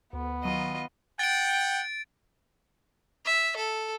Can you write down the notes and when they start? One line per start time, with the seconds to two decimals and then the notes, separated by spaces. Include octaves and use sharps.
0.13 D2 B3
0.43 D#3 F#3 F4 D#5 D#7
1.19 F#5 G5 A6 D7
3.25 E5
3.56 A4